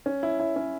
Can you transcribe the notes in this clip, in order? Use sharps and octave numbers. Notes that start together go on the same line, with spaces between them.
C#4
E4
E4
C#4